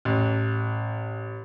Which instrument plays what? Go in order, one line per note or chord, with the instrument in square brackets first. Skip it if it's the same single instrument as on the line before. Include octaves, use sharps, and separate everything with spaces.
[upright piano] A1